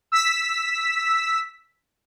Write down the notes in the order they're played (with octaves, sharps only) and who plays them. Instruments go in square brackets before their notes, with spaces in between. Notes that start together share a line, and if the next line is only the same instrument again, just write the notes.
[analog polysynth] E6 B6